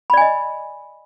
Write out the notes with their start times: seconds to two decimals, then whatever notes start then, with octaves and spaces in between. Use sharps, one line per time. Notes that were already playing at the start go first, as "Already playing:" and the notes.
0.10 B5
0.14 D5
0.17 G#5
0.21 D#5